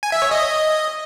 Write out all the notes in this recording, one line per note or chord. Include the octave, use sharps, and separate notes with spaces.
G#5
E5
C#5
D#5